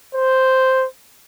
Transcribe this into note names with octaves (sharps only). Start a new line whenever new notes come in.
C5